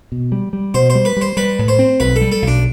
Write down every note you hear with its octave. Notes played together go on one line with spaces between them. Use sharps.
B2
G3
G3
B2 C5
C5
G3
B4
G3 C5
G3 B4
A2
C5
C4
B1 B4
A4
G3
A4
B1
D4